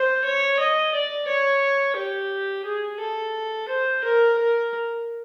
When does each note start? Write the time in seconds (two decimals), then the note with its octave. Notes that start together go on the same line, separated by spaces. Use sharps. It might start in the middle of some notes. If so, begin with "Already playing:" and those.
Already playing: C5
0.25 C#5
0.59 D#5
0.94 D5
1.28 C#5
1.96 G4
2.65 G#4
3.00 A4
3.69 C5
4.04 A#4
4.38 A#4